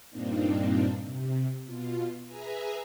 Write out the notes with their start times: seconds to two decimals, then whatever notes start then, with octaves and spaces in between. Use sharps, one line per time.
0.10 G2 A#2 A#3 C4 D4 D#4
1.02 C3
1.66 B2 F4
2.25 G#4 B4 E5 G#5 A#5